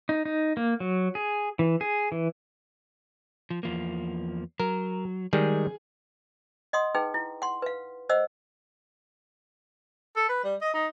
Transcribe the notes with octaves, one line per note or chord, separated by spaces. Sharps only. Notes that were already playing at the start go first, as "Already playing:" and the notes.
D#4
D#4
A#3
F#3
G#4
E3
G#4
E3
F3
E2 F3 A#3
F#3 A#4
D#3 G3 G#3 G#4
D#5 F#5 C6 D#6
D#4 G#4 B4 G5
E4
F#5 C6
B4 F5
C5 D#5 F#5 E6
A4
B4
G3
D#5
D#4